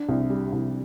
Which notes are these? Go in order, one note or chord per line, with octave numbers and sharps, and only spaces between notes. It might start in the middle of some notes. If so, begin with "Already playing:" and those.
Already playing: D4
C2
G3
C2